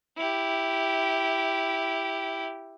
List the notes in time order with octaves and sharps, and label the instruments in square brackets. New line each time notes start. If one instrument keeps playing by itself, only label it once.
[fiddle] E4 G4